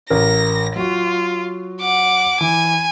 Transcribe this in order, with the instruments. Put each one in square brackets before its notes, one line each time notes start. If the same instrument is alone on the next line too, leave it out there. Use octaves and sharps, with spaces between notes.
[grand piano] A1 A#4 [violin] A#6
[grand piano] F#3 F#4 [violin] F4
[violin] F#5 D6
[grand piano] E3 [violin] G#5